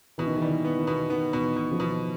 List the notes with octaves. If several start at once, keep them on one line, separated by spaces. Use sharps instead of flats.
B2 E3
D#3
E3
G3
E3
B3
D#3
B2
D#3 B3
B2
E3
B2
D#3 F3
B2